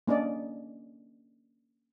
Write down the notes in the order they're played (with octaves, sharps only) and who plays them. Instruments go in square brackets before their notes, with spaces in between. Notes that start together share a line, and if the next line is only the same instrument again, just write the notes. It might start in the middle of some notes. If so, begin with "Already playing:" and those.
[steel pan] A#3 C#4 D4 D5 D#5